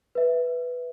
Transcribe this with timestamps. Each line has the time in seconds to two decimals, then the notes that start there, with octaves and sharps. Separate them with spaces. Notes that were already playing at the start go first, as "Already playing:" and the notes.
0.15 B4 E5